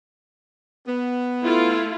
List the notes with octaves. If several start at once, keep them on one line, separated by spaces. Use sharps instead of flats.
B3
A3 E4 F4